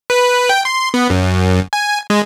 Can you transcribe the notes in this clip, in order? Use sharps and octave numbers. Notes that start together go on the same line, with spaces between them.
B4
G5
C6
B3
F#2
G#5
G#3